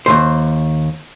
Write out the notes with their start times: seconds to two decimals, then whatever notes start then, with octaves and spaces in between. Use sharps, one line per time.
0.06 D#2 B2 C5